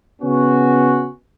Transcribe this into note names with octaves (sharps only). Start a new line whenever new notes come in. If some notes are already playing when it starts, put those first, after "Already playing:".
C#3 B3 C#4 F#4